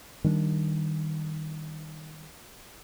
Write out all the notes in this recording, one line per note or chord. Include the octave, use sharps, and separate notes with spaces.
D#3 G3 A3 D4